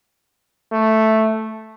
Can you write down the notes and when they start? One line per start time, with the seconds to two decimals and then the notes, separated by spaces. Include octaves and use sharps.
0.72 A3